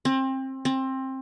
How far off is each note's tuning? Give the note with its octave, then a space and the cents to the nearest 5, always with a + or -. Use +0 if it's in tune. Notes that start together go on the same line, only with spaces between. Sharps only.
C4 +25
C4 +20